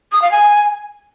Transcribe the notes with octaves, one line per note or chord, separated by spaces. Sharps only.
D#6
F5
G#5